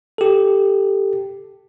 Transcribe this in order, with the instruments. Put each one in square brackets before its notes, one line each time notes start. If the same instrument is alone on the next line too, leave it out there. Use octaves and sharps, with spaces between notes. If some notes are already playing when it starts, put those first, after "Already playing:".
[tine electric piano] G4 A4